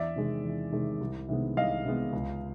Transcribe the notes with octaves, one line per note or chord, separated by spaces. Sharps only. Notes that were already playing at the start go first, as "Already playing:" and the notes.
Already playing: E2 D5 E5
C3 D#3 G#3
E2
C3 D#3 G#3
C2
C3 D#3 G#3 B3
C2 D#5 F5
C3 D#3 G#3 B3
C#2